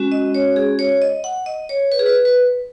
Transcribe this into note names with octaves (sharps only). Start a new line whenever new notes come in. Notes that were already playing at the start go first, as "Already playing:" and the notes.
Already playing: G#3 C#4 F#4
D#5
C#5
G#4
C#5
D#5
F#5
D#5
C#5
B4
G#4
B4
B4